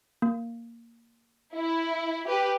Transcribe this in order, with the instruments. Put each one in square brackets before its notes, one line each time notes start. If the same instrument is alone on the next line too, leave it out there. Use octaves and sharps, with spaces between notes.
[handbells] A#3
[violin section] E4
G4 B4